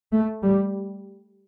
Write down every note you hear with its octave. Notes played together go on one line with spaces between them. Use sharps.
A3
G3